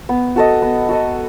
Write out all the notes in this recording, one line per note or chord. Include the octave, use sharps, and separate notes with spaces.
B3
F#4 A4 D#5
B3
F#4 A4 D#5